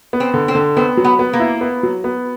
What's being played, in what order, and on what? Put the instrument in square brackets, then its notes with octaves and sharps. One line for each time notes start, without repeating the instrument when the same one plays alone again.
[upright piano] B3
[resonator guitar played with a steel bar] C4
[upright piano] D3
[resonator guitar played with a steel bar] C4
[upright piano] D3
[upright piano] B3 [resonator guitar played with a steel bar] C4
[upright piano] F#3
[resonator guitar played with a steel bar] B3
[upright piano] B3
[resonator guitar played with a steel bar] A#3
[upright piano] E4
B3
F#3
B3